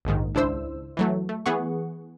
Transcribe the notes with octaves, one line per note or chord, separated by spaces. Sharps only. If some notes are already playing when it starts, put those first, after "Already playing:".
A#1 D#2 G#2 D#3
C#2 D4 E4 C5 E6
E3 F#3 A3
A3
E3 B3 G#4 F#5 C#6